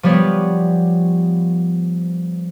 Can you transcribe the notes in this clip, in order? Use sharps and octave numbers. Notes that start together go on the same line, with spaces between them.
F3 G3 B3 C#5 D5